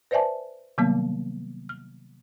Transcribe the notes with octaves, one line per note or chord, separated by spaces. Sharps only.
B4 C5 D5 E5 G#5 A5
C3 D#3 F#3 G3 A#3 B3
F6